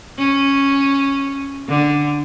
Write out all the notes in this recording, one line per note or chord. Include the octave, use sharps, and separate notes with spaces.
C#4
D3